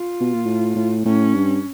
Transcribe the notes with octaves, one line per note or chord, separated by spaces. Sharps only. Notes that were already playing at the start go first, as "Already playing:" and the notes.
Already playing: F4
B2
A#2
A2
A2
A2 C#4
G2